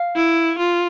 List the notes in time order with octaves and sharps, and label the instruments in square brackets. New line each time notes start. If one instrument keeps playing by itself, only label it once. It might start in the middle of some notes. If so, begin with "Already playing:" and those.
Already playing: [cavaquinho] F5
[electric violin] E4
F4